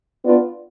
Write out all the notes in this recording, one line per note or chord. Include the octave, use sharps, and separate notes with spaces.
B3 D4 F4 B4 D5